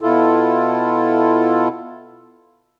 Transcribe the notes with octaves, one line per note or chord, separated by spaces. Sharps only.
B2 E4 F4 A4